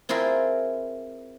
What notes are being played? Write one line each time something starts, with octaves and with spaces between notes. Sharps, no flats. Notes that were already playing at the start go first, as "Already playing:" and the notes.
C4 E4 F4 G#4 A#4